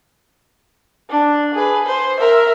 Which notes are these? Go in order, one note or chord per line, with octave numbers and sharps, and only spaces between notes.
D4
G#4 B4
C5
A#4 E5